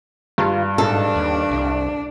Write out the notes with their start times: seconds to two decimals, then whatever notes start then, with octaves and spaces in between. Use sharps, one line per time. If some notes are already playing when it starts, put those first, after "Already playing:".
0.38 G2 F4
0.78 G#2 D4 A4
1.16 D#2
1.51 C2